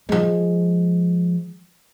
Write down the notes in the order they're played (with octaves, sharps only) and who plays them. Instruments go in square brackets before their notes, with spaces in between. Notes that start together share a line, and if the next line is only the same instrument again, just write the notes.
[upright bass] F3 G#3